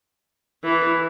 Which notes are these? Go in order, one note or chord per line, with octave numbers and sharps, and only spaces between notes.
E3